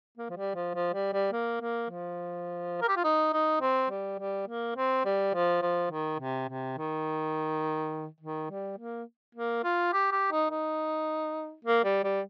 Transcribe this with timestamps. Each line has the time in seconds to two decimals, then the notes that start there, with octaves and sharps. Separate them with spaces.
0.17 A#3
0.30 F3
0.37 G3
0.55 F3
0.75 F3
0.94 G3
1.13 G3
1.32 A#3
1.61 A#3
1.90 F3
2.81 A#4
2.88 G4
2.96 F4
3.04 D#4
3.33 D#4
3.61 C4
3.90 G3
4.19 G3
4.47 A#3
4.76 C4
5.05 G3
5.34 F3
5.62 F3
5.91 D#3
6.19 C3
6.49 C3
6.78 D#3
8.20 D#3
8.50 G3
8.78 A#3
9.35 A#3
9.64 F4
9.93 G4
10.12 G4
10.32 D#4
10.50 D#4
11.64 A#3
11.84 G3
12.04 G3